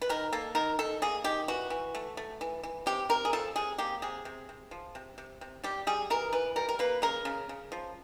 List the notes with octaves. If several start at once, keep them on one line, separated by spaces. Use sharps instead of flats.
B4
D#3 A#4
A#3 A4
D#3 A#4
D#3 A4
A#3 G#4
D#3 G4
E3 F#4
E3
A3
A3
E3
E3
C3 G4
C3 A#4
G#4
F3 A4
C3 G#4
A#3 G4
C3 G#4
C3
C3
F3
C3
C3
C3
G3 G4
G3 G#4
E3 A#4
E3 B4
G3 A#4
A#4
A#3 B4
C#3 A#4
C#3
C#3
F3